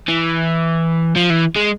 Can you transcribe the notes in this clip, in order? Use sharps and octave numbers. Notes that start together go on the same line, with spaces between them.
E3
F3
E3
G#3